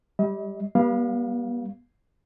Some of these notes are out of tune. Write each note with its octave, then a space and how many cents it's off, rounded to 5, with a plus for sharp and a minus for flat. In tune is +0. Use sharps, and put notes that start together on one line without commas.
G3 +0 D#5 +40
G3 +0 B3 -40 F5 +0